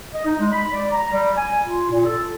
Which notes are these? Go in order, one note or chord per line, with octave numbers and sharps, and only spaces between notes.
D#5
D#4
G#3
B5
D5
A#5
G3
G#5
F4
A#2
A4